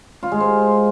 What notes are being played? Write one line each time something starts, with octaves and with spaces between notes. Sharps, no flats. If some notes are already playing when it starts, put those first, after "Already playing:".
F4
G#3
C5